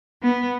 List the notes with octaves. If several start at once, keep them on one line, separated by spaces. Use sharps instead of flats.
B3